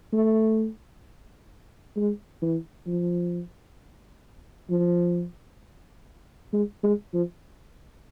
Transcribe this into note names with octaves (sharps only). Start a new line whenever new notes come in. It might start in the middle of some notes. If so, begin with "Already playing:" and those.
A3
G#3
E3
F3
F3
G#3
G#3
F3